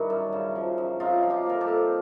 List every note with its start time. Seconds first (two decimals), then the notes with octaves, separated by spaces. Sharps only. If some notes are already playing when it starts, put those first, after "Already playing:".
Already playing: G2 D#3 E4 F#4
0.10 F#2
0.33 C#3
0.55 F3
0.78 F#2
1.00 C3 D#4 F4
1.23 F3
1.30 F4 G4
1.46 A#3 A#4
1.61 G4 A4
1.68 C3